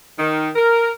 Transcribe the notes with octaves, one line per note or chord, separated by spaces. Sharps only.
D#3
A#4